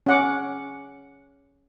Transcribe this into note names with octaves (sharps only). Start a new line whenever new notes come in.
C#4 F#5 D6